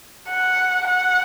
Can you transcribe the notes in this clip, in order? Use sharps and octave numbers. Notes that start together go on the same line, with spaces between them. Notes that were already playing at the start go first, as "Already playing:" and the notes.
F#5
F#5